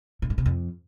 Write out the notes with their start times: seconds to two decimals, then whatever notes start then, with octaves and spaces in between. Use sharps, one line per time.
0.22 A#2
0.30 G#2
0.38 C3
0.46 F2